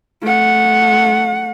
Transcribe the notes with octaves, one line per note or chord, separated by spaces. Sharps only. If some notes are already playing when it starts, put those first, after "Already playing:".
A3 F#5